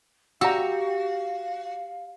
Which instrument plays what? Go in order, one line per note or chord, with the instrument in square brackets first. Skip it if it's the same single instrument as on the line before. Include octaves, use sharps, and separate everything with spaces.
[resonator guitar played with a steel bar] F#4 [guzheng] G4 [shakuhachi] F5 [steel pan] A#5 E6